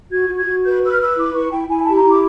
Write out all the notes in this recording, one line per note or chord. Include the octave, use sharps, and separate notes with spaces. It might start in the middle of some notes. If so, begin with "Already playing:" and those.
F#4 G#6
F#4
G#6
F#4
B4 G6
B4 E6
F6
B4 E6
E4 D6
E4 C#6
E4 G5
E4 G#5
G4 A5
A#5
E4 D6